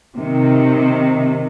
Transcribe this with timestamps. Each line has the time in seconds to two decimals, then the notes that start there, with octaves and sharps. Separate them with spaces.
0.17 C3 D#3